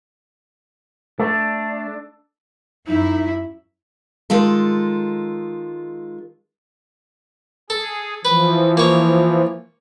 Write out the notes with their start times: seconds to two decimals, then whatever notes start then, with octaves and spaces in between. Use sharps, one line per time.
1.19 A3 D4 A4
2.87 F#2 D#4 E4 E5
4.30 D#3 G#3 F4 A4
7.70 G#4 A4
8.25 E3 F3 B4
8.77 A#3 C#5